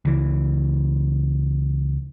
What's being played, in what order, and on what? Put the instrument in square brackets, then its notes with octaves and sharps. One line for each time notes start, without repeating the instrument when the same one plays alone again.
[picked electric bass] C#2 E3